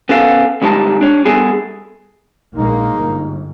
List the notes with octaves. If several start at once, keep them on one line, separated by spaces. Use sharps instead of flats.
B3 C#4 A4 F5
D2 G3 G#3 D#4 A5
D4 C#5
G3 B3 G#4 A4
A#1 G#3 A#3 D#4
G1